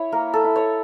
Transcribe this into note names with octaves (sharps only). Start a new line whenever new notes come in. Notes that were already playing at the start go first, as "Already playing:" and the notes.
Already playing: E4 C#5
A#3 A#4
A4
E4
C#5